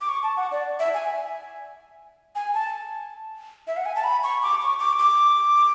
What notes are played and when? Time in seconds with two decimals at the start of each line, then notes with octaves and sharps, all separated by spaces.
0.01 D6
0.09 C#6
0.23 A5
0.37 F#5
0.52 D5
0.79 E5
0.94 G#5
2.35 G#5
2.54 A5
3.67 E5
3.77 F#5
3.86 G#5
3.95 A5
4.04 B5
4.23 C#6
4.42 D6
4.61 C#6
4.79 D6
4.99 D6